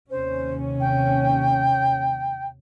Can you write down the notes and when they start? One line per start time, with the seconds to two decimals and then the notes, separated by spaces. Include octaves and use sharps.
0.10 D#2 C3 C#4 C5
0.80 G5